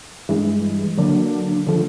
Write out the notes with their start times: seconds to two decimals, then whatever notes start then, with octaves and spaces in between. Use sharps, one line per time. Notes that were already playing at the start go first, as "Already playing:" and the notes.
0.29 G2 E3 G#3
0.98 D3 F#3 A#3 D4
1.67 D3 F3 A3